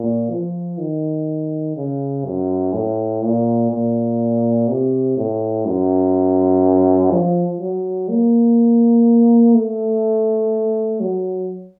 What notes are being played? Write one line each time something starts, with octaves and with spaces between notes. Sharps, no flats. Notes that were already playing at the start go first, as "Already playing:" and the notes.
Already playing: A#2
F3
D#3
C#3
F#2
A2
A#2
A#2
C3
A2
F#2
F3
F#3
A#3
A3
F#3